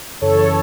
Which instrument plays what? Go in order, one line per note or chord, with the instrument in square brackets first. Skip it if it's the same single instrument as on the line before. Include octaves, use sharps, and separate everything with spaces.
[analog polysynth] F#2 C#3 E3 A4 C#5